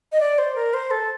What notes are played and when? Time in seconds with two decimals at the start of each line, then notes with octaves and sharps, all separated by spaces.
0.12 D#5
0.20 D5
0.38 C5
0.55 A#4
0.74 C5
0.91 A4